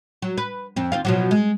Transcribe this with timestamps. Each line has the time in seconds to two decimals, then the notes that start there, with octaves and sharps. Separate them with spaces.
0.22 F#3
0.38 B4
0.76 F2 C4
0.92 D#2 C4 F4
1.05 B2 F3 F#3
1.31 G#3